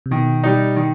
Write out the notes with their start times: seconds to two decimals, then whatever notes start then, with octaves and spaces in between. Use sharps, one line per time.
0.06 C3
0.11 B2 D#3
0.44 G3 D#4
0.76 D#3